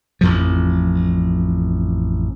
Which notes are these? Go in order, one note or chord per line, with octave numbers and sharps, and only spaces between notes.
A1 F2 F3